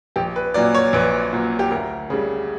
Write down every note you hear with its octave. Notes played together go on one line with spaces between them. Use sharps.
A#1 G4
B4
A#2 F#3 D5
C#5
A#1 B4
A#2 F#3
G4
D2 A#4
C#3 G3